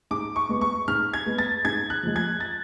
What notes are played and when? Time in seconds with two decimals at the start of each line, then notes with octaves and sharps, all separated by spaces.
0.11 G#2 D6
0.36 C#6
0.49 G#3 B3
0.61 C#6
0.88 G#2 F6
1.14 G#6
1.26 G#3 B3
1.38 A6
1.65 G#2 G#6
1.90 F#6
2.03 F3 G#3
2.16 G#6
2.41 A6